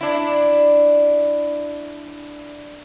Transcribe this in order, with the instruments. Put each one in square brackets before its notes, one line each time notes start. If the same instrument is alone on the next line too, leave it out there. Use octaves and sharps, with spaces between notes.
[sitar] D4 E4